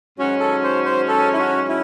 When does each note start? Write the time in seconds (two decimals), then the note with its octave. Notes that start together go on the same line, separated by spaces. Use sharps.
0.18 G#2 D#3 F#3 C#4 F#4
0.40 A4
0.63 C5
0.85 C5
1.08 A4
1.33 E4
1.38 F#4
1.68 E4